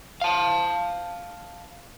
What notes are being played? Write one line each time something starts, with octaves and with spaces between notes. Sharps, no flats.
F5 A5